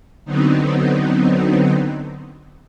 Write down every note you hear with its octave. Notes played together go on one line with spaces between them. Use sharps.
D3 F#3 B3 C4 D#4